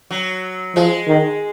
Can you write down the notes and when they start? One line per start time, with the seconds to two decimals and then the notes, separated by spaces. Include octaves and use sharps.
0.11 F#3
0.76 F3 G#3
1.08 D#3